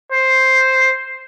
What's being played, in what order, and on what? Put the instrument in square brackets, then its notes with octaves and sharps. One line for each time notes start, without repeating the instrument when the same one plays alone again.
[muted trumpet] C5